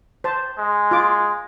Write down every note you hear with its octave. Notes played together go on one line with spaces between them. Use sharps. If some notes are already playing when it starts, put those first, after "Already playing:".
C5 A5
G#3
F4 D6